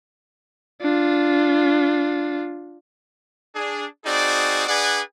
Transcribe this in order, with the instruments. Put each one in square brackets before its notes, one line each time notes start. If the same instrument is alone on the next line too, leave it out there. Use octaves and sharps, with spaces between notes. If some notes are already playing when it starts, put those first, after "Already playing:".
[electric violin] D4 F4
[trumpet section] D4 G#4
C4 D#4 F#4 G#4 D5
D4 G#4 B4 D5 F#5 G#5